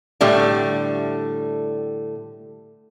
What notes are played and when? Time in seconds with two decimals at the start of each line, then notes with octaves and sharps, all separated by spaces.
0.21 A2 D3 G3 A3